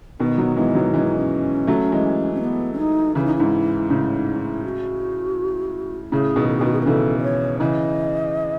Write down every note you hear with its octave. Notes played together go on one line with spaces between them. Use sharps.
B2 D#3 B3
D#3 F#3
E3 G#3 B3
D#3 F#3
E3 G#3 C#4
D#4
C#4
F#3 A3
E3 G#3
C#4
B3
C#4
D#4
C#3 E3 E4
D#4
G#2 E4
A2 C#3
D#4
E4
F#4
A2 C#3 G#4
B2 D#3
A4
G#4
B2 D#3 F#4
G#4
B4
C#3 E3 A4
D#5
C#5
C#3 E3 D#5